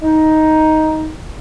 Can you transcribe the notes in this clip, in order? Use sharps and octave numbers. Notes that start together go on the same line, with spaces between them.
D#4